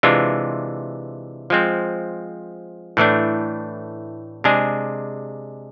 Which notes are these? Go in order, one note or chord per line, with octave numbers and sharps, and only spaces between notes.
C3 E3 G#3 D4 F4
F3 G#3 C4
A2 E3 A3 D4
C3 G#3 D4 G#4